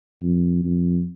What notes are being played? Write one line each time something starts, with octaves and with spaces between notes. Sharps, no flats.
F2
F2